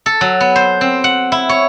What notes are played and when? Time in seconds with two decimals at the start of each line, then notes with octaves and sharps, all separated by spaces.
0.06 A4
0.21 F#3
0.40 B3
0.56 C5
0.81 C4
1.04 F#5
1.32 E4
1.49 C#5